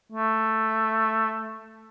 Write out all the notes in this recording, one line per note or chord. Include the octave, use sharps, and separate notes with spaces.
A3